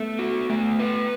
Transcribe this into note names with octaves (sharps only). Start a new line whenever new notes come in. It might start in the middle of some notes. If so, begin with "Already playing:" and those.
Already playing: A3 B3
F#4
A3
B4